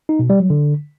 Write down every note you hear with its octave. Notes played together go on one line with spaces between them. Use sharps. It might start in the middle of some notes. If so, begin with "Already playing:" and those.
D#4
B2
G3
F#3
D3